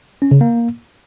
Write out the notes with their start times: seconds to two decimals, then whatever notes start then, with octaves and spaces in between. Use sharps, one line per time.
0.22 C#4
0.31 C#3
0.41 A#3